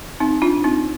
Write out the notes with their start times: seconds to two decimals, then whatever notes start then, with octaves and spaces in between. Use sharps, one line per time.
0.20 C4 D#4
0.42 D4 F4
0.64 C4 D#4